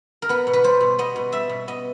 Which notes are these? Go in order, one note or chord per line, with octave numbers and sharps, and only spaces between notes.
A#4
B3 B4
B2
B4
G3 C5
B2
B3 D#5
B2
G3 E5
B2
B3 D#5